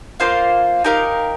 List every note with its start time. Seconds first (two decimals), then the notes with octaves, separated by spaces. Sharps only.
0.20 A#3 F4 C5 F5
0.84 D#4 G4 A#4 F5